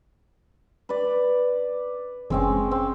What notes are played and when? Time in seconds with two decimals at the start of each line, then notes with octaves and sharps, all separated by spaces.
0.89 B4 D5
2.30 F#1 G#3 C4 C#4
2.71 C4